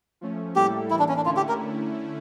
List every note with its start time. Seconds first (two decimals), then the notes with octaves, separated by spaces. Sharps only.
0.21 F3 A3 C#4
0.56 A2 G3 A#3 E4 G4 A4
0.91 A2 E3 A#3 E4
0.99 D4
1.09 C#4
1.17 D4
1.25 D3 A3 C#4 E4 F4
1.37 G4
1.49 A#4